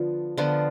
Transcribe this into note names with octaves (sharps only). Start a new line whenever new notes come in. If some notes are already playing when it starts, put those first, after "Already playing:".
Already playing: D3 F3 B3 F4
D3 F3 B3 F4